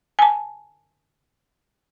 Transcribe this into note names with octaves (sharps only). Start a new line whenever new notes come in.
G#5 A5